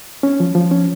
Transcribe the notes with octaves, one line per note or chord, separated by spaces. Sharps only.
C#4
F3
F3
C#4